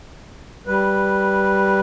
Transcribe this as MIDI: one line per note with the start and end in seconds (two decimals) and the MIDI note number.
0.67 1.80 55
0.67 1.80 71